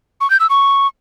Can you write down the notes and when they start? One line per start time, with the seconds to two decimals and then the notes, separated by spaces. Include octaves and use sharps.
0.21 C#6
0.30 G6
0.40 E6
0.50 C#6